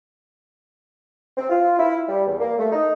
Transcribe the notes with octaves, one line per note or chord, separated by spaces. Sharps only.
C4
F4
E4
G3
E2
A#3
A3
D#4